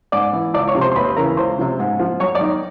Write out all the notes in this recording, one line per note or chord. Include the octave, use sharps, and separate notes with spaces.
G#2 D5 D6
E3
C#2 D5 D6
C#5 C#6
C3 F3
C5 C6
C6
D#2 B4 B5
C#3 E3 A#4 A#5
C#2 C5 C6
C3 F3
G#2
F3
F#2 C#5 C#6
D5 D6
D#3